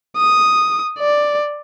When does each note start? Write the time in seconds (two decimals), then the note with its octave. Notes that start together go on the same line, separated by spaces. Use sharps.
0.17 D#6
0.99 D5